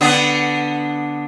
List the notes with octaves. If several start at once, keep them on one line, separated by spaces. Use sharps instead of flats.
D3 B3 D4